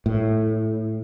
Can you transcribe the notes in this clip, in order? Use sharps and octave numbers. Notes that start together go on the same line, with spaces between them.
A2